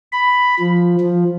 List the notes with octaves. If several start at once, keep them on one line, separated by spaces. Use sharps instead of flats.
B5
F3
F3